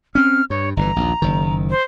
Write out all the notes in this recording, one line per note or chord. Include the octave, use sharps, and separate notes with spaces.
C4 C#4 F6
G2 C#5
G1 B2 E3 A#5
A#1 D#2
F#1 D#3
C5